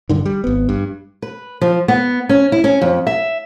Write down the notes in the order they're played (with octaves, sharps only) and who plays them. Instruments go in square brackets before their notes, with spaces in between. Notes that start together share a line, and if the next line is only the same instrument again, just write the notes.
[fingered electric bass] G2 D3 D#3
G3
G#1 B3
G2
[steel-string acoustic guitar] B4
F3
B3
C#4
E4
C#4
F2
E5